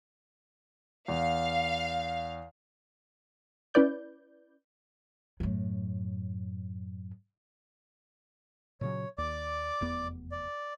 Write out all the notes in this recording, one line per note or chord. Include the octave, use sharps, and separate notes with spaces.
E2 F5
C#4 E4 B4 D5 G6
F#2 A2
A#2 C#3 F#3 C#5
D#2 D5 D6
F1 E2 B3
D5